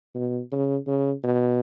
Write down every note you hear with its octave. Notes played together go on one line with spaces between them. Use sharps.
B2
C#3
C#3
B2